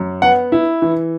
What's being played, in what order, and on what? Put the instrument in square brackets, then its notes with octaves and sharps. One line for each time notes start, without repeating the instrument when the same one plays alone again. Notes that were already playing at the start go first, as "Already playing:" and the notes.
Already playing: [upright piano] F#2
B3 F#5
E4
E3